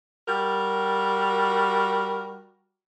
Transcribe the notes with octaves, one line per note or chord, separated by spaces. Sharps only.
G3 F#4 A#4